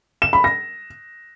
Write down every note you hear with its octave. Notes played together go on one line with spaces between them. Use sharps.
E7
B5
A#6